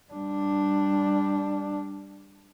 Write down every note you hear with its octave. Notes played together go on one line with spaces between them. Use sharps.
G3 D4